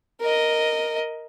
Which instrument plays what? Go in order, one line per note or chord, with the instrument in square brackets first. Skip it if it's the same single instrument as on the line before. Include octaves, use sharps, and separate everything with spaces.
[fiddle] A#4 D#5